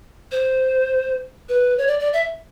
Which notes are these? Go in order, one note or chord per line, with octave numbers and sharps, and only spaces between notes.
C5
B4
C#5
D5
D5
E5